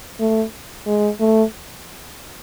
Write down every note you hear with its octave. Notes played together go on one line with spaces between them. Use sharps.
A3
G#3
A3